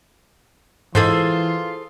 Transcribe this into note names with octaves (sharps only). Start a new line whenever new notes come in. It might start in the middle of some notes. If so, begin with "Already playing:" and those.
G#2 E3 F4 G#4 A4 C5 C6